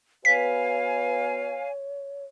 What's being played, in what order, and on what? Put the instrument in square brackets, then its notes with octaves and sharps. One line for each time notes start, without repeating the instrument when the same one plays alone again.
[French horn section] B3 F#4 B4 [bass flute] C#5 [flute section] F5 G#5 [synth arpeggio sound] B6